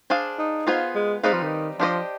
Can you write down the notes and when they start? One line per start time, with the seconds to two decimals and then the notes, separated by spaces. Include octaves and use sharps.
0.10 D4 G#4 C5 F5
0.39 D#4
0.67 B3 F4 G#4 C5 F5
0.95 G#3
1.23 G3 G#3 C4 D#4 B4 F5
1.33 F3
1.43 D#3
1.79 F3 D4 G4 C5 D#5